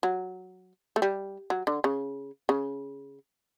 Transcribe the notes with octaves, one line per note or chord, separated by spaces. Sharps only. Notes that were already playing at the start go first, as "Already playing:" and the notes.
F#3
A3
G3
F#3
D3
C#3
C#3